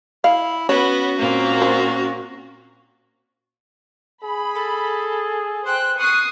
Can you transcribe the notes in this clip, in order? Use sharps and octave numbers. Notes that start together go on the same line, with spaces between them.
E4 F5
B3 C#4 F#4 C#5
A#2 A#3 C4
C5
G#4 B5
A4
C5 G5 F#6
C#6 D#6 F#6 C7